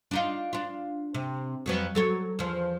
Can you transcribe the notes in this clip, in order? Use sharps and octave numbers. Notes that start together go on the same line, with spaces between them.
D4 D#4 F4
D4 F4
C3
F2 F#3 B3
F#3 A4 C#5
E2 F3